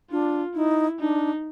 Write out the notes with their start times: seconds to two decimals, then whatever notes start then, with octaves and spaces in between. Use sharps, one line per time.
0.11 D4 F4
0.55 D#4 E4
1.00 D4 D#4